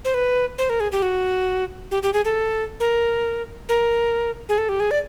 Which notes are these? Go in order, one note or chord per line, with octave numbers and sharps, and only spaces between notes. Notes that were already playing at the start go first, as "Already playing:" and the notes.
C5
B4
C5
A#4
G#4
G4
F#4
G4
G4
G#4
A4
A#4
A#4
G#4
A4
G4
G#4
D5